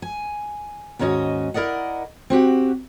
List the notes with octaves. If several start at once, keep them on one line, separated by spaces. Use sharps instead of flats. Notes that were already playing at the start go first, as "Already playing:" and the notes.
G#5
D#2 G#2 C#4 F#4 D#5
E4 A#4 D5 D#5 F#5
C4 F#4 G4 F#5